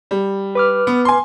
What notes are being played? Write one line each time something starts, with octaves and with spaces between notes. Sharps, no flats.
G3
B4 D6 F6
B3
G#5 C6